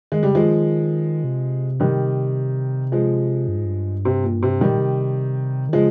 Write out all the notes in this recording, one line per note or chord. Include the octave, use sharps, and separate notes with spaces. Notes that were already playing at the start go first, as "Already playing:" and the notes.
D#3 G#3
C#3 G3
D#3 F3 G#3
C3
D#3 G3
F3 G#3
G2
G#2
G2
C3
A#2
C3
C3 D#3 G3
A#2
C3
D#3
C#3 F3 G#3